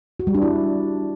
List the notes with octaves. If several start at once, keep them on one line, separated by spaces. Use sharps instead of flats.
F#4
G3
D4
E4